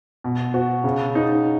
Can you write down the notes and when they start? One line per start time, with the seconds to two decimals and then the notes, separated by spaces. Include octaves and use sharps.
0.24 B2
0.54 F#4
0.84 C#3
1.15 D#4